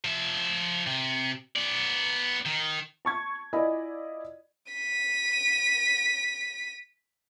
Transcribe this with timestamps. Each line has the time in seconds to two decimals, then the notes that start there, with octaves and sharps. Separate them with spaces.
0.05 F3 E5
0.87 C3
1.56 B3 D5
2.46 D#3
3.05 A5 C#6 G#6
3.53 E4 F4 D5 D#5 G#5 B5
4.72 B6 D#7